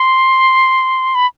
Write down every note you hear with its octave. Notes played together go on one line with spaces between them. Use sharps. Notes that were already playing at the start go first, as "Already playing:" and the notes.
Already playing: C6
B5